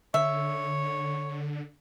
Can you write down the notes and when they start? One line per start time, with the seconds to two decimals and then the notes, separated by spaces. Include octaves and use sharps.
0.14 D3 C#5 E5